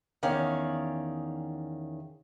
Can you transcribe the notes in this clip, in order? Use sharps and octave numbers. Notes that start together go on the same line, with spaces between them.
E2 D#3 C#4 D5 F5